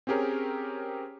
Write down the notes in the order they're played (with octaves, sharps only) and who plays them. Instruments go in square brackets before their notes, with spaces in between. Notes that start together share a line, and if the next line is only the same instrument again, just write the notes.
[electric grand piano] C4 C#4 G4 G#4 A#4 C#5